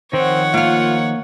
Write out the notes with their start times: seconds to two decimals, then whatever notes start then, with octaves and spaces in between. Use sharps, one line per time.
0.13 D#3 F3 C4 C#5 F#5
0.54 A#3 F4 F5